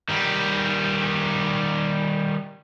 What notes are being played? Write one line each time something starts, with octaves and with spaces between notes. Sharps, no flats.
D#3 G3